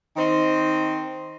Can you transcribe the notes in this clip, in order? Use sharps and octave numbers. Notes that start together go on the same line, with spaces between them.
D#3 C4 D#4